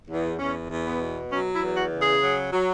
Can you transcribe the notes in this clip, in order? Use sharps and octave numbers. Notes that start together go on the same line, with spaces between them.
E2
E2 C#4
E2
B3
B2
F#3 C#4
E4
E2
F#4
C#3
G#4
F#3
F#3